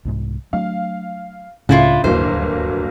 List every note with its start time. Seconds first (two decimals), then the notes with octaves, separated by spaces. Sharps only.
0.05 C2 G#2
0.53 F#3 A3 D4 F5
1.69 C#2 A2 C#3 D4 E4 F4
2.04 D1 G1 D#2 F#3 A#3 C5